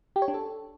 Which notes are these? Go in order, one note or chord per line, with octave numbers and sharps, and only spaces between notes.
G4
C#5
D4
A4